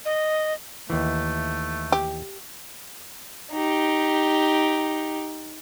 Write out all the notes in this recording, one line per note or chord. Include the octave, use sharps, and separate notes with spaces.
D#5
D#2 E3 A3
G4
D#4 G4